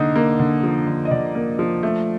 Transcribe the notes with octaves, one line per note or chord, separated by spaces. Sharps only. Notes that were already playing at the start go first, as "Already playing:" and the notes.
Already playing: D3 A#3 D#4
A#3
D3
F3
D3
D#5
D3 D5
A#3
F3
A3